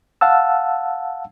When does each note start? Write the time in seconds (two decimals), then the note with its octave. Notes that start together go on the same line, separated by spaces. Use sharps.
0.21 F5 F#5 A5 E6